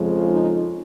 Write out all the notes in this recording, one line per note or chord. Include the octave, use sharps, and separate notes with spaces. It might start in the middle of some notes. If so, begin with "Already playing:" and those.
Already playing: F2 C#3 F3 G#3
D#4